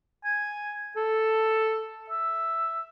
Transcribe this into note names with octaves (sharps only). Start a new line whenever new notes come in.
G#5
A4
E5